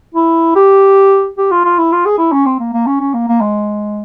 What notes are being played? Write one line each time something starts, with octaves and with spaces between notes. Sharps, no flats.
E4
G4
G4
F4
F4
E4
F4
G#4
E4
C#4
C4
A#3
A#3
C#4
C#4
A#3
A#3
G#3